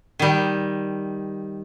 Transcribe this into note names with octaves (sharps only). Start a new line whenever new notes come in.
D#3 G3